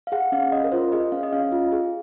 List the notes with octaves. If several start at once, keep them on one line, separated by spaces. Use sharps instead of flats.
F5
G#4 F#5
C#4 F5
C#4 D#5
A#4
F4 C5
G#4 D#5
C#4 F5
D#5
C#4 F5
F4
G#4